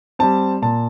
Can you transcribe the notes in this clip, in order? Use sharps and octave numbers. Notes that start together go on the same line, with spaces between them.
G3 C4 A5
A#2 A5